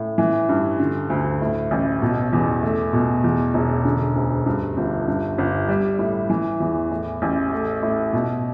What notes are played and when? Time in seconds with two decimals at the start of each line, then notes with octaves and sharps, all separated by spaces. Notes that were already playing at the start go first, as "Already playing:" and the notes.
Already playing: A2
0.18 E3
0.49 G2
0.79 D3
1.10 D2
1.41 A2
1.71 A1
2.02 B2
2.33 E2
2.63 A3
2.93 B2
3.24 E2
3.54 E1
3.85 D3
4.16 D2
4.46 G2
4.77 G1
5.08 G2
5.38 G1
5.68 G3
5.99 A2
6.30 E3
6.60 E2
6.91 A2
7.22 A1
7.52 A3
7.82 A2
8.13 B2